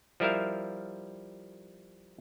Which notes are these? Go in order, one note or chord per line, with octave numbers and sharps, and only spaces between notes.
F3 G3 E4 A#4 E5 F5